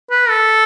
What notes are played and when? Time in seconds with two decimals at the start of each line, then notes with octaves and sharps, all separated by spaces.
0.10 B4
0.29 A4